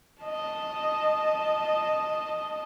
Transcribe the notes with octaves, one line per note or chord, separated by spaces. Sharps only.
D#5 A5